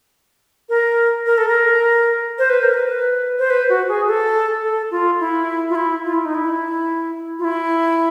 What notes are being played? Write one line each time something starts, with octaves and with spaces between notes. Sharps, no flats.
A#4
A#4
A4
A#4
C5
B4
A#4
B4
C5
B4
F#4
G#4
A4
A4
F4
E4
F4
E4
F4
E4
D#4
E4
F4
E4